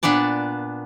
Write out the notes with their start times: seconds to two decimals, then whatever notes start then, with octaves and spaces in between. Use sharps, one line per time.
0.03 A#2 B3 D4 D5 A5